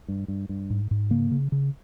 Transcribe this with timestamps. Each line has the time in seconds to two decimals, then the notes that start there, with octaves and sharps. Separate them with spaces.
0.08 G2
0.28 G2
0.49 G2
0.70 G#2
0.91 G#2
1.10 C#3 A#3
1.31 C#3
1.52 C#3